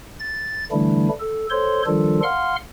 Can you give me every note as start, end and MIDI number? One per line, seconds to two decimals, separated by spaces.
0.20 0.64 93
0.72 1.09 50
0.72 1.09 52
0.72 1.09 55
0.72 1.09 57
0.72 1.09 62
0.72 1.09 64
1.20 1.47 69
1.50 1.82 69
1.50 1.82 72
1.50 1.82 73
1.50 1.82 84
1.86 2.20 51
1.86 2.20 53
1.86 2.20 55
1.86 2.20 62
1.86 2.20 65
1.86 2.20 69
2.23 2.56 77
2.23 2.56 78
2.23 2.56 84
2.23 2.56 89